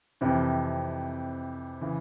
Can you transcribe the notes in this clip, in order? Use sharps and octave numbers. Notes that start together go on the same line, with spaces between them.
F2 C3 E3
C#3 E3